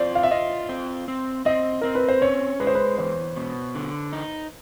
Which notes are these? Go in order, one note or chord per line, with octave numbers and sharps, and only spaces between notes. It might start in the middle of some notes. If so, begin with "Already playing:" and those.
Already playing: C4 F4 C5 D5
F5
E5
F4 D#5
C4
C4
C4 D#5
C4 A#4
B4
C5
C#4 C#5
G#3 B4
C5
B4
E2 C5
B2
D3
D#4